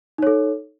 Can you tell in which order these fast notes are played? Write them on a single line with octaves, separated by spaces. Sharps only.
D#4 C#5 A4